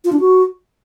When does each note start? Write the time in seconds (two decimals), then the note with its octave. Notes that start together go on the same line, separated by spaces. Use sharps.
0.05 F4
0.12 D4
0.20 F#4